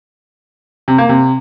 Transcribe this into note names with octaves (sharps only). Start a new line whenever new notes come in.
C3
A#3
C3